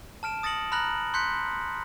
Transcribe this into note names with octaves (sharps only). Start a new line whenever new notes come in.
A5 F6 D7 E7
D#6 A6 A#6 C#7 F#7
A#5 B5 F6 F#6 A#6 F#7
C6 F#6 G6 B6 C#7